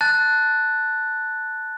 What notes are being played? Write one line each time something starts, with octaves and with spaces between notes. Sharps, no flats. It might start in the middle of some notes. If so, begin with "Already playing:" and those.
A5 F#6 A6